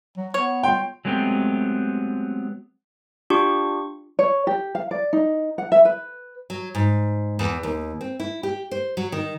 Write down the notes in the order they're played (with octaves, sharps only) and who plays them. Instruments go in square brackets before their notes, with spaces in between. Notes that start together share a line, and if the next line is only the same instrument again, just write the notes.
[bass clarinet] F#3
[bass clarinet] B3 [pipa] C#5
[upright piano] G5 C6
[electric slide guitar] F#3 G#3 A3 B3 C4 G4
[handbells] D4 F4 G4 C#6
[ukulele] C#5
G4
F5
D5
D#4
F#5
E5
B4
[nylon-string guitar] F#3
G#2
E2
D#2
C4
E4
G4
C5
F#3
D#3